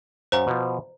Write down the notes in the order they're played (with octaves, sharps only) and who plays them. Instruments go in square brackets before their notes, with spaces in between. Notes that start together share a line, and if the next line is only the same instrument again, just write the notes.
[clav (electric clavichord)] F#2 A#4 F5 [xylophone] C5 A#5
[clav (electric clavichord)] B2 F3